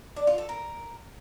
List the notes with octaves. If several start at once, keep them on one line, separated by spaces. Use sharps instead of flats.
D4
F4
A4
A#4